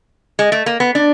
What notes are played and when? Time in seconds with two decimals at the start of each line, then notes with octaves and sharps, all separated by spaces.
0.39 G#3
0.52 A3
0.66 A#3
0.80 B3
0.95 D4